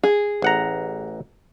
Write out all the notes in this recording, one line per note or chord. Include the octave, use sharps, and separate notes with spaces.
G#4
A1 F#5 A#5